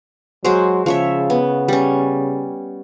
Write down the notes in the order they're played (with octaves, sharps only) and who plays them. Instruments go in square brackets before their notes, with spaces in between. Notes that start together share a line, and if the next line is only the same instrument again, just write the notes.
[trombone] F#3 [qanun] G#3 F#4 C5
[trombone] C#3 [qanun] F3 C#5 E5
[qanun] B3
G3 C#4